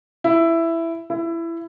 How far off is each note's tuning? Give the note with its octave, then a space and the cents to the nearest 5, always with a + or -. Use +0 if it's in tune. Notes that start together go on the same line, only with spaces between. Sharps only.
E4 +10
E4 +20